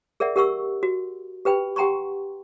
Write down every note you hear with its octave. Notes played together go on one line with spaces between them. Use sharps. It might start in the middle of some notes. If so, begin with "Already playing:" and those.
G#4 A#4 D5 E5 F#5
G4 A#4 F#5 C#6 E6
F#4
G4 B4 G5 B5
G4 F#5 G5 A#5 C6 C#6